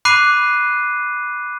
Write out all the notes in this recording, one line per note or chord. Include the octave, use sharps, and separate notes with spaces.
B5 D6 F#6 C7 D#7